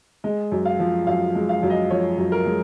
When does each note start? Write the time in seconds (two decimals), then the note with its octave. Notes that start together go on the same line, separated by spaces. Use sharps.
0.24 G#3 D#5
0.52 F#2
0.65 F5
0.80 F3
1.07 F#2 F5
1.35 G#3
1.49 F5
1.63 F#2
1.70 D#5
1.91 F3 C#5
2.18 F#2
2.32 A#4
2.46 G#3